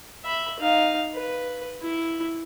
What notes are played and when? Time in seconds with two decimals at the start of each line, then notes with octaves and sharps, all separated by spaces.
0.24 E5 B5
0.60 D#4 F5
1.15 B4
1.82 E4